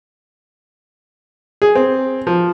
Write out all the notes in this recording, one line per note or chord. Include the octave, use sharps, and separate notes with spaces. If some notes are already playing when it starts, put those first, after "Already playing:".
G#4
C4
F3